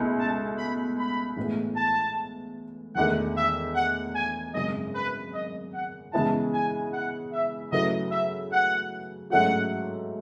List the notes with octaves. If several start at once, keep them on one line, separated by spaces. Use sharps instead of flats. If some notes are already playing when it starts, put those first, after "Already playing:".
Already playing: C#2 B2 A3 E4
A5
B5
B5
A1 A2 G#3 B3
A5
E1 E2 D#3 A3 F#5
E5
F#5
G#5
G#1 F#2 C#3 G#3 D#5
B4
D#5
F#5
C#3 E3 G#3 B3 E4 A5
G#5
F#5
E5
C#3 F#3 A3 E4 B4 D#5
E5
F#5
G#2 F#3 A3 C#4 F#4 F#5